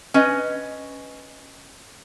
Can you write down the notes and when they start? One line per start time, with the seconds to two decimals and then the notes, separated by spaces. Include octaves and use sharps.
0.14 C#4 B4 D#5